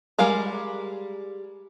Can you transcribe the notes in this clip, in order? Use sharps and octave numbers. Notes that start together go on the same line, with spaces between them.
G3 G#3 A#4 F5 A#5